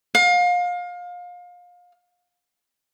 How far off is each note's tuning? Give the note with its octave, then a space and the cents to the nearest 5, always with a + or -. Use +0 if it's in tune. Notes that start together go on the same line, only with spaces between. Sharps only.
F5 +30